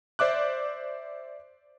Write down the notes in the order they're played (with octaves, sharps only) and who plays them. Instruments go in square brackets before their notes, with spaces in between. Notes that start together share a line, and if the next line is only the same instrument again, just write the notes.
[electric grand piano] C5 D5 E5 D6 F#6